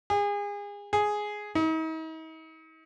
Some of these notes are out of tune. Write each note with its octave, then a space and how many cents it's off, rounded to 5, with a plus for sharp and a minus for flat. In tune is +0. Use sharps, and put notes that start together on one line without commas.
G#4 -30
G#4 +5
D#4 +45